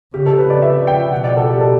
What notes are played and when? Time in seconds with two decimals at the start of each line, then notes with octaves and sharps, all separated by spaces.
0.14 C#3 G4
0.26 A4
0.39 B4
0.50 D5
0.62 E5
0.87 G5
1.11 B2 F#5
1.24 D5
1.37 A4
1.49 G4
1.61 A4